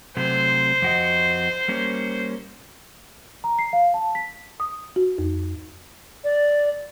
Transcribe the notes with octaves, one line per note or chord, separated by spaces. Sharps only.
C3 F#3 A3 C5
F2 F#4 D#5
G3 A#3 C#4
A#5
C7
F5
A5
B6
D#6
F#4
F2
D5